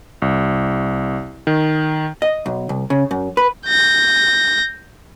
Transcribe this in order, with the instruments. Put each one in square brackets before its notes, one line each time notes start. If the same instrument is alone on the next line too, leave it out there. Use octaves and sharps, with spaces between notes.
[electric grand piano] C2
D#3
[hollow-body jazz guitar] D#5
B1
C2
C#3
F#2
B4
[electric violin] G6 A#6